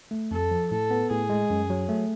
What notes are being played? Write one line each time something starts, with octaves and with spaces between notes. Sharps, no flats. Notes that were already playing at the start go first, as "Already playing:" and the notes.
A3
F2 A4
F3
A2 A4
B3
A2 G#4
G#3
F#2
F#3
A3